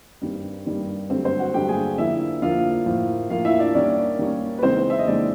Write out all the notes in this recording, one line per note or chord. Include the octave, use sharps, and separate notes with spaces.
G2 D#3 G3 C4
G2 D#3 G3 C4
G2 D3 F#3 A3 C4 C5
C4 C5
F#4 F#5
G2 D3 F#3 A3 G4 G5
G#4 G#5
D3 F3 A#3 E4 E5
D3 F3 A#3 F4 F5
A2 F3 A#3
A2 F3 A#3 F4 F5
E4 E5
D4 D5
D#3 G3 A#3 C#4 D4 D5
D#3 G3 A#3 C#4
B4
C#3 E3 G#3 C4 D#4 C5
E5
D#5
C#3 E3 G#3 C4 D4 D#4 D5